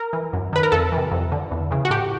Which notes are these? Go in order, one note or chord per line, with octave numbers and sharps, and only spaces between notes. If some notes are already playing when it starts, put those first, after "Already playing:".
Already playing: A#4
E3
F#2
D#3 B4
A#4
F2 A4
C3 E3
F2
D3
E2
C#3 E3
F#4
A2 G4